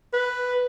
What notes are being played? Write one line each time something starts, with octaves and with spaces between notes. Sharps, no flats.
B4